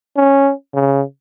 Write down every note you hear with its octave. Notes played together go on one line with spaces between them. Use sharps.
C#4
C#3